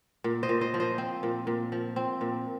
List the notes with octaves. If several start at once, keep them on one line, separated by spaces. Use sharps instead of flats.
A#2
C5 D#5
A#2
C5 D#5
F3
C5 D#5
C4
A#2
A#2
F3
C4
A#2